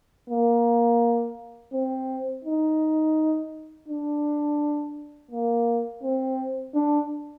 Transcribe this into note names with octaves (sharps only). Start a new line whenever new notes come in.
A#3
C4
D#4
D4
A#3
C4
D4